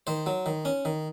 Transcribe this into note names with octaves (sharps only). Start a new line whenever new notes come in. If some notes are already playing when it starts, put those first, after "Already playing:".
D#3 C5
F#3
D#3
C#4
D#3